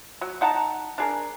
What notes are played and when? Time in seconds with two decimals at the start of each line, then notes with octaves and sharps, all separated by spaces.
0.21 F#3
0.41 D#4 F#5 A5 A#5
0.98 D4 G#4 A#4